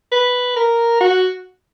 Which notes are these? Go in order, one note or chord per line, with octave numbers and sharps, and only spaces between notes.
B4
A#4
F#4